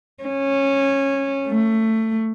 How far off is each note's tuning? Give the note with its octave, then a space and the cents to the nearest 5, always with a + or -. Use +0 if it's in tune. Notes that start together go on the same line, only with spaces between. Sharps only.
C#4 -15
A3 +15